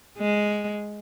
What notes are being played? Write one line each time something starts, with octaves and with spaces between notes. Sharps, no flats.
G#3